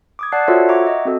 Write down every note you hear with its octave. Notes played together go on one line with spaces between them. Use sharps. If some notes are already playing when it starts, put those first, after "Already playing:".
D6 D#6 G#6
D5 F#5 A5 F#6 C7
F4 F#4 A4 C5 C#5 E5
E5 F#5 A#5 C#6 D6 G#6
D#5
C4 F#4 A4